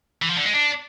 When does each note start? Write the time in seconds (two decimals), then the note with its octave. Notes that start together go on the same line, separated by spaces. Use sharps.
0.22 E3
0.30 F3
0.38 D3
0.45 G#3
0.53 D4